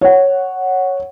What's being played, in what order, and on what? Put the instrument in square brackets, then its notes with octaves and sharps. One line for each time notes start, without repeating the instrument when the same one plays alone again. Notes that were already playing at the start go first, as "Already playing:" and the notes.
[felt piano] C#5 F#5